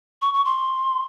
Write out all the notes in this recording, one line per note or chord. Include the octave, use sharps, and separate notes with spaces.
C#6
C#6
C6